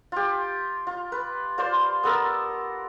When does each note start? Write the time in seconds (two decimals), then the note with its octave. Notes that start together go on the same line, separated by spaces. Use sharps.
0.12 F4 G4
0.87 F4
1.12 B4
1.58 F4 C5 D5 C6
2.03 B3 A4 A#4